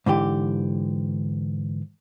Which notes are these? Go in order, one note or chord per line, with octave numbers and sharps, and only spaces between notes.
G#2 D3 E3 G4